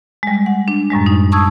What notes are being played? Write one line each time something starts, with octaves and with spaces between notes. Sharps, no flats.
G3 G#3
F#5
D4
F#2 A2 G3 G#3
D#4
A5 C#6 D#6 E6 G#6